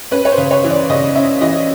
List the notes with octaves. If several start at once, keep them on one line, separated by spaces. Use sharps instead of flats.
C#4 B4
C#5
C5
C#3
C#5
E3
D5
C#3 D#5
C#4 E5
E3 D#5